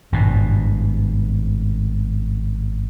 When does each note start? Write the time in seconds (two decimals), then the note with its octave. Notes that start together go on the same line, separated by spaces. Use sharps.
0.12 G#1 G2 B2